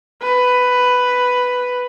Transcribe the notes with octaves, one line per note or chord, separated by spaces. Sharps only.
B4